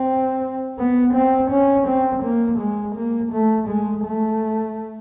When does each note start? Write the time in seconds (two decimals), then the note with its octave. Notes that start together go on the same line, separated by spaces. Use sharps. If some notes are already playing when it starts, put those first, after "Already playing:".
Already playing: C4
0.78 B3
1.14 C4
1.51 C#4
1.87 C4
2.23 A#3
2.59 G#3
2.95 A#3
3.32 A3
3.69 G#3
4.04 A3